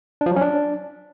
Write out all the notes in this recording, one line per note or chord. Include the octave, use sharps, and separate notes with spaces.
D4
F3
F#3
C#4
D4